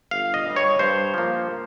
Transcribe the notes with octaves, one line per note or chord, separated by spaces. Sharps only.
G1 F5
D#5
G2 G3
C#5
G2 C5
F3 A#3